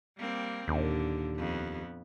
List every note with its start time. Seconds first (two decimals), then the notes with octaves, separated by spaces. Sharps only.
0.18 G3 A#3 C4
0.68 D#2 A#2 D3
1.36 F2 B3